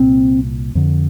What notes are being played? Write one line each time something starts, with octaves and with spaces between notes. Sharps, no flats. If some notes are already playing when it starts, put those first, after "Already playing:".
Already playing: C2 A#2 C4
F2 D3